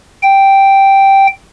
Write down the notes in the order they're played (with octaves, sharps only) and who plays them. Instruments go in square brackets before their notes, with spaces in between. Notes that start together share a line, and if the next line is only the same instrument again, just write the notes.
[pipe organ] G5